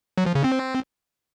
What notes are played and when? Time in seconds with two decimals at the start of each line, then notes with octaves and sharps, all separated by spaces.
0.18 F#3
0.26 F3
0.35 C#3
0.44 C4